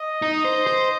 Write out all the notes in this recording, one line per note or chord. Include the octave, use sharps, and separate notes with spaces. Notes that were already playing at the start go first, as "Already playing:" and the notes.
Already playing: D#5
D#4
C5
C5